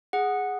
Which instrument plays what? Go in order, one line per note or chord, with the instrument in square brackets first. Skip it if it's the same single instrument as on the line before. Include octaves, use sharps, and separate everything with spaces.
[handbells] G#4 F#5